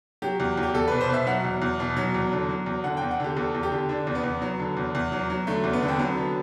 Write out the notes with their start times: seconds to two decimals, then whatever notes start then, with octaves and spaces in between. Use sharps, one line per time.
0.22 F#3 G4
0.40 E2
0.57 E2
0.63 G4
0.74 E2 A4
0.88 B2 B4
1.01 C5
1.09 B2 E5
1.27 F#3 F#5
1.44 E2
1.62 E2
1.80 B2
1.97 F#3
2.15 E2
2.32 D3
2.49 F#3
2.66 E2
2.84 D3 F#5
2.97 E2 G5
3.11 F#5
3.20 D3 G4
3.37 E2 A4
3.55 E2
3.63 G4
3.72 D3
3.89 D3 D4
4.07 E2
4.15 B3
4.24 E2
4.42 F#3
4.60 D3
4.77 E2
4.95 E2
5.12 F#3
5.30 F#3
5.47 D3 A3
5.64 E2
5.73 B3
5.82 D3
5.88 C4
5.99 F#3 B3
6.17 D3